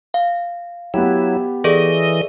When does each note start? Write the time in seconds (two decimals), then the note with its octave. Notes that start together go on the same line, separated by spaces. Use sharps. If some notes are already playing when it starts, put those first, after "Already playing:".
0.14 F5
0.94 F#3 B3 E4 G4
1.64 E3 G#4 A4 D5 D#5